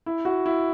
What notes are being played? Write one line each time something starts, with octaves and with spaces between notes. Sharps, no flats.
E4
F#4
E4